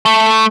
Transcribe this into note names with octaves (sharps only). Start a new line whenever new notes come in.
A3